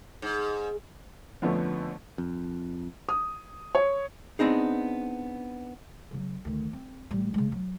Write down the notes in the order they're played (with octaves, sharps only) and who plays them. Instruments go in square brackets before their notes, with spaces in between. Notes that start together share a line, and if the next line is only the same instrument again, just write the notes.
[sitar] G#2
[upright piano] F2 D3 F3 A3 B3 C#4
[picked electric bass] F2
[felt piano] D#6
C#5
[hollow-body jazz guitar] B3 C4 D4 D#4 G#4
[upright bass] C#3 F#3
D2 D#3
C4
A1 G3
C#3 G#3
F#3